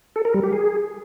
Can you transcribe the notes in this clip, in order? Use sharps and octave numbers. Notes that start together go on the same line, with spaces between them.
A4
A#4
G3
G4
G#4